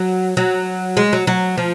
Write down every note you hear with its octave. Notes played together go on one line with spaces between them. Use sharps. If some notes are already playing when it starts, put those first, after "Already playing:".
Already playing: F#3
F#3
G#3
F#3
F#3
F3